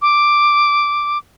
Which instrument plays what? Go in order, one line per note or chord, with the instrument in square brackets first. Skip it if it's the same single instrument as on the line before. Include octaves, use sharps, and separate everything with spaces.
[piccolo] D6